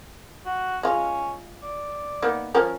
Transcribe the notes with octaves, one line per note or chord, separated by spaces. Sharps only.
F#4
G#3 C#4 F4
D5
A#3 B3 D#4
F3 C#4 A#4